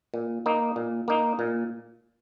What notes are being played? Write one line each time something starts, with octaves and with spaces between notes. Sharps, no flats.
A#2
A#3 D#4
A#2
A#3 D#4
A#2